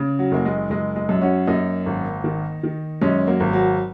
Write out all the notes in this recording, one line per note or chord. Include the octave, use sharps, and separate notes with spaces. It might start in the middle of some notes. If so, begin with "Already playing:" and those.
Already playing: C#3
F#3
F#1 A#3
G#3
F#1 G#3
G#3
F#2
C#4 F#4
F#2 A#3 D#4
G#1
D#3
D#3
F#2 G#3 C#4
F#3 A#3
G#1
F#3